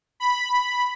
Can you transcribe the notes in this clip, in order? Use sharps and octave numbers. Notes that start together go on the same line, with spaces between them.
B5